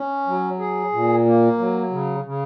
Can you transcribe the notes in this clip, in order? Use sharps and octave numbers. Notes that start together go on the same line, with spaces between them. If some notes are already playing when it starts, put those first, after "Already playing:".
Already playing: C#4
F#3
G#4
A#2
A#3
F#3
C#3
C#3